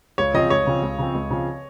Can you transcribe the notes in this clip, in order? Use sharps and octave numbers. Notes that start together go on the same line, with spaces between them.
C#2 C#5
C#3 F3 C4 D#5
C#2 C#5
C#3 F3 C4
C#2
C#3 F3 C4
C#2
C#3 F3 C4